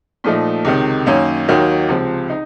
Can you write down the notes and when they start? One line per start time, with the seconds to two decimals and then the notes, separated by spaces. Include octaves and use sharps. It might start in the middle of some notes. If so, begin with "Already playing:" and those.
0.24 A#2 F3 A3 D#4
0.65 C#2 C3 D#3
1.06 F#2 D#3 A#3 C#4
1.48 D#2 D#3 F#3 A#3
1.89 C#2 C3 F3 C4
2.30 D#4